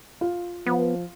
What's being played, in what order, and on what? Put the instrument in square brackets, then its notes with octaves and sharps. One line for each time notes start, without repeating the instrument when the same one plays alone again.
[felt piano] F4
[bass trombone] F3 [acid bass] B3